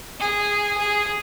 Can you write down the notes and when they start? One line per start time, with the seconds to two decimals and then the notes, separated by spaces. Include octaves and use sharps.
0.20 G#4
0.77 G#4